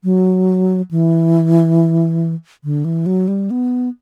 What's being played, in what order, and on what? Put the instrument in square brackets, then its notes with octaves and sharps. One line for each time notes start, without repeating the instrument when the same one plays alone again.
[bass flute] F#3
E3
D3
E3
F#3
G3
B3